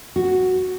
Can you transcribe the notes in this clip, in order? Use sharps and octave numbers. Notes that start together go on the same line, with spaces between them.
F#4